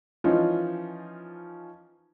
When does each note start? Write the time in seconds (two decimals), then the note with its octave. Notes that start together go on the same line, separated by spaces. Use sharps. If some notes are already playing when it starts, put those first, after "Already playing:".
0.24 E3 F3 C#4 D#4 F4